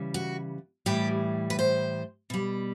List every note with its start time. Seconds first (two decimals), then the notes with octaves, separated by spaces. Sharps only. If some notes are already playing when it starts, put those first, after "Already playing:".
Already playing: C#3 E3 G3
0.14 F#4
0.86 A2 E3 G3 G4
1.50 B4
1.59 C5
2.30 B2 G3